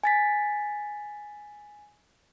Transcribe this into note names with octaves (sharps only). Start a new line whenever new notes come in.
G#5 A6 B6